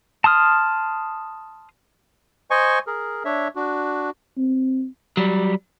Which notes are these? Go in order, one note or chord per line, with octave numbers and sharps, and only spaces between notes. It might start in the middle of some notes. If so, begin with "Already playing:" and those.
A5 C6 D#6 F6
C5 D#5 G#5 C#6
G#4 A#4
D4 C#5 E5
D4 F#4
C4
F#3 G3